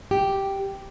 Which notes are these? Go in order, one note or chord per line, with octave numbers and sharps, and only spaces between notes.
G4